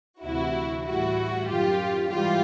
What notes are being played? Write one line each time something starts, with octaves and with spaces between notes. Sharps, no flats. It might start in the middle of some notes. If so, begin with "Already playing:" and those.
D2 C3 E3 E4 F#4
A2 E3 G3 E4 F#4
F#2 D#3 F#3 F4 G4
G#2 E3 G3 F4 G4